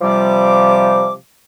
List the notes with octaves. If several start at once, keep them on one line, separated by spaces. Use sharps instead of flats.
C3 F3 G3 D6